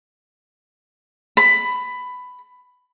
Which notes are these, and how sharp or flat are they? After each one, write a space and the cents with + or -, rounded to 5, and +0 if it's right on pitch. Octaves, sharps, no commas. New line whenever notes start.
B5 +15